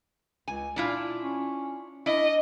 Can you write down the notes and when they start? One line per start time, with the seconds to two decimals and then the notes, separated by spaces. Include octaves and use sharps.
0.48 C#2 G#5
0.76 A#2 D4 E4 F4
1.23 C#4
2.06 D4 E4 D#5